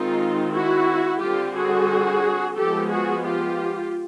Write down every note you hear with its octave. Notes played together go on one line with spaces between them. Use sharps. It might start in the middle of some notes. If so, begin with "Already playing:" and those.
Already playing: D#3 G#3 C4 D#4 F4
E4 F#4
D3 G3 C4 F4 G4
F#4 G#4
F3 G#3 B3 G4 A4
F#4 G#4
F4 G4